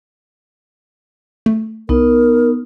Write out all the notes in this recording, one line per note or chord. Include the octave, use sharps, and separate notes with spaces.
A3
C2 B3 D#4 A#4